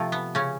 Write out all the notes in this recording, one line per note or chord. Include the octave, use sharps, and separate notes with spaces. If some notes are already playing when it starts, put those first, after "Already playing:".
Already playing: C3 F3 A3
B3
C#3 C#4